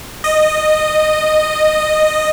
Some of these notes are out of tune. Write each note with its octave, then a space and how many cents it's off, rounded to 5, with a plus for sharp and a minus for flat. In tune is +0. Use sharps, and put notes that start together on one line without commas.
D#5 -10